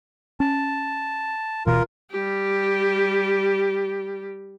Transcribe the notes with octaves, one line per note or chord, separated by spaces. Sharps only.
C#4 A5
D1 B2 E3 F4 A#4
G3 G4